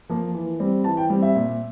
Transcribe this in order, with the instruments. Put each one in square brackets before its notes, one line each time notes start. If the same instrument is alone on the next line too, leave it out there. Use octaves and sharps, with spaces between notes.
[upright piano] F3 A#3
E3
G3 C4
E3 A5
G5
G3 C4
E5
A#2